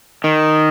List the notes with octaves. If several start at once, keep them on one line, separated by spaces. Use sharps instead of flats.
D#3